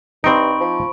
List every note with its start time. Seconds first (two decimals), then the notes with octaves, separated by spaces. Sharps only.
0.24 G2 C4 D#4 B5 C#6 D7
0.60 F3